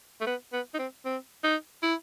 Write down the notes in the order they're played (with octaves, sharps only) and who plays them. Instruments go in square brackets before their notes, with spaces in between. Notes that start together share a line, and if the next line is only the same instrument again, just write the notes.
[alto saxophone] A3
B3
B3
D#4
C4
C4
D#4
E4